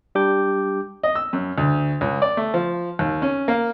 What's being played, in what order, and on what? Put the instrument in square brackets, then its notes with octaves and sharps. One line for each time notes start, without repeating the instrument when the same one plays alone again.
[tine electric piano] G3 D4 G4 D6 G6
[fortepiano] D#5
E6
F#2
D2
C#2
D5
A3
F3
D#2
C#4
A#3